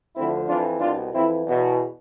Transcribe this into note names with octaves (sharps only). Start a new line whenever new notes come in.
D2 D3 F3 C4 E4
F2 E3 D4 F4
C2 B2 D4 F4
F2 E3 C4 E4
E2 B2